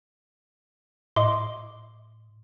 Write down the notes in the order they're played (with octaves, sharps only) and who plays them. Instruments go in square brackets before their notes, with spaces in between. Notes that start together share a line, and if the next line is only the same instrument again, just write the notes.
[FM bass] A2 [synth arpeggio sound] D#5 E5 [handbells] C6 D6